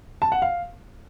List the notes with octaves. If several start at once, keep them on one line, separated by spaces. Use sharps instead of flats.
A5
F#5
F5